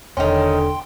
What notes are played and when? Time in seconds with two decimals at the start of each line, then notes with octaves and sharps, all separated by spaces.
0.17 E1 D3 D#3 C#4 G5 C6